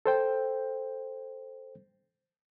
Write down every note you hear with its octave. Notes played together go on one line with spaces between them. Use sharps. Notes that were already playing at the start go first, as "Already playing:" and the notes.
A4 C5 G5